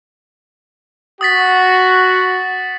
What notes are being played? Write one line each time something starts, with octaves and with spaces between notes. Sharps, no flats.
F#4 D#6 A6 B6